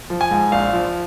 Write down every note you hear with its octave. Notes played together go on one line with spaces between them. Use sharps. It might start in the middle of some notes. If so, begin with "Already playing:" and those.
F3
G#5
G#2
A#1 F5
F3